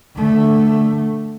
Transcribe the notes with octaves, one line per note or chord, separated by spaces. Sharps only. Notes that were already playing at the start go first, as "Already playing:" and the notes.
D3 A3